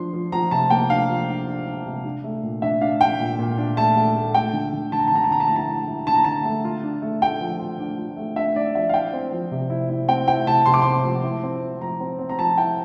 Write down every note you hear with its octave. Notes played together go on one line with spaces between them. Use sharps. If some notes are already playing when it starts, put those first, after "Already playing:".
Already playing: F3 D4 C6
F3
F3 A#5
C3 A5
A#3 G5
D4 F5
F3
D4
D4
D4
C3
D4
A3
A#2
D4 E5
D4 F5
D4 G5
A#2
A#2
D4
A3 A5
A3
A3
A3 G5
D3
D3
D3 A5
A#5
A5
D3 A#5
A5
D3 A#5
A5
E4 A#5
A5
E4
E4
D3 A5
A#5
D3 A5
A3
F4
D4
A3
A3 G5
F3
F4
D4
F4
A3
D4 E5
D4 D5
F3 E5
F5
E4 G5
C4
F3
C3
E4
E4
C4 G5
E4 G5
C3 A5
C3 C6
D6
C4 C6
F3
E4
C4
E4
F3 A#5
C4
C4
A#5
F3 A5
E4 G5